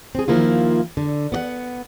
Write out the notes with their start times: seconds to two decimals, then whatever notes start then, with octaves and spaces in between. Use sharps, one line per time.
0.15 C4 G#4
0.28 D#3 F3 A#3 E4 F4
0.97 D3
1.32 B3 D5 F#5